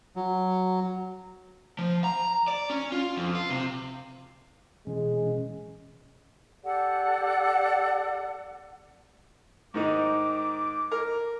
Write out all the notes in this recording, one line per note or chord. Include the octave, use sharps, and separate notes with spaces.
F#3
F3
A#5
D5
C#4
F4
F2
F4
C3
B2 E3 G#3 C#4
G4 A4 D5 F#5
G#2 D#3 D#4 D6
A#4